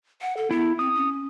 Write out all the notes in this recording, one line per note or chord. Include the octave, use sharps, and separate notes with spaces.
F#5
A4
B3 E4
C4 D#6
C#4